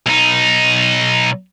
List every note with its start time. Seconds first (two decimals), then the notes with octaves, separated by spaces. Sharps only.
0.06 B1 D#4